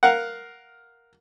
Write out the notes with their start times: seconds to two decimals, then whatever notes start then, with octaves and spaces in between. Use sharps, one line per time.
0.03 A#4 F5 F#5